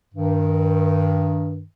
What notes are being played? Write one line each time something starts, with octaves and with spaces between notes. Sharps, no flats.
G2 D#3